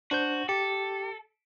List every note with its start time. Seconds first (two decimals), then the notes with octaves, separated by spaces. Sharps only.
0.11 D4 F#4 C5 G6
0.49 G4 A4